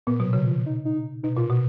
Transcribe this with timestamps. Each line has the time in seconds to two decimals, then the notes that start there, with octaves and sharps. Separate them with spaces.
0.07 A#2 B3
0.20 B2 F#3
0.33 C#3 F#3
0.47 F3
0.66 D#4
0.85 D#4
1.23 B2 D#4
1.37 A#2 F4
1.49 B2 F#4